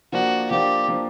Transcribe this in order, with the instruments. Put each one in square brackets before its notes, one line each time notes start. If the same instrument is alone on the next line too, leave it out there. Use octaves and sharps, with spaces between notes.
[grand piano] F3 A#3 D4 [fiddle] F#4
[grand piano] F3 A#3 D4 [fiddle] G4
[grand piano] F3 A#3 D4